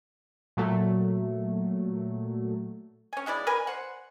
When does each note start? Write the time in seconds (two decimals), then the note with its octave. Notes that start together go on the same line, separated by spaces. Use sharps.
0.57 A#2 F#3 A3
3.13 C#4 G#5
3.26 B2 G#3 E4 D5
3.47 A#4 B4 D5 G#5
3.67 C5 F#5